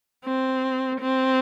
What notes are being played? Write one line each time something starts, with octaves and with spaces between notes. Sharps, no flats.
C4
C4